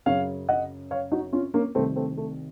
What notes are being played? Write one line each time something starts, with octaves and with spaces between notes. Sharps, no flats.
F#2 C#3 C#5 F5
D#5 F#5
C#5 F5
D#4 F#4
C#4 F4
A#3 C#4
C2 C3 D#3 A3 C4
A3 C4
A3